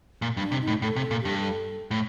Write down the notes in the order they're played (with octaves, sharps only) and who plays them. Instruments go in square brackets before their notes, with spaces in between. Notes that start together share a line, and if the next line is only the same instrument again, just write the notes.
[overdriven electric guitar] A#2
G2
[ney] D4
[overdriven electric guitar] C3
[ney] D#4
[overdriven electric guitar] A2
[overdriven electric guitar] A2 [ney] A4
[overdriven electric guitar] C3
[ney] A4
[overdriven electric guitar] A#2
[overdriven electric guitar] G2 [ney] G4
[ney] A4
[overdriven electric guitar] A2